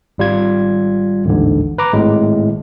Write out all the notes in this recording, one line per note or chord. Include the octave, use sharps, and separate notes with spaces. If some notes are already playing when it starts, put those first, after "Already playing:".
G#1 G3 F4 G#6
A1 D#2 G#2 D3
B4 A#5 D6
G#1 A2 G#3